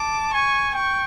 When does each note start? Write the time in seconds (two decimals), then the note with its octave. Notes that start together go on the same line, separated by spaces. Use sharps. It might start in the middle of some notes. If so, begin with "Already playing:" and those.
Already playing: A5 D6
0.33 G#5 C#6
0.74 G5 C#6